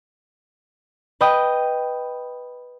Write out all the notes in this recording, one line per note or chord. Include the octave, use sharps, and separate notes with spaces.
B4 D#5 G5 D#6